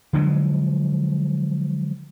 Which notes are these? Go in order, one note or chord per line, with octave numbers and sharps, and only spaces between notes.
D3 F3 F#3 G#3